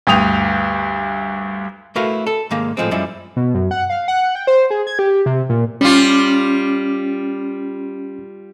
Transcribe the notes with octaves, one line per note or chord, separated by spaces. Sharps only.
D2 G2 G5 D#6 F7
A3 E4 F#4 A#4 B4 F5
A4
G#2 D#3 A#3 F5
A2 F3 G#3 C4
F#2 F3 G3 G#3 E4
B2
F#2
F#5
F5
F#5
G5
C5
G#4
G#6
G4
C3
A#2
G3 C#4 F4